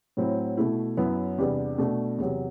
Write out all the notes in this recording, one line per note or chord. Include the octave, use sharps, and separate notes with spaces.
A2 F#3 C4 E4
B2 A3 E4
F#2 F#3 B3 E4
E2 C3 G3 B3 D4
B2 A3 D4
E2 C3 F#3